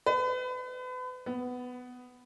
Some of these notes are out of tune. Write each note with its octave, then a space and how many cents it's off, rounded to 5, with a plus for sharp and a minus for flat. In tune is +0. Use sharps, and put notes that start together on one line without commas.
B4 +35
B3 +10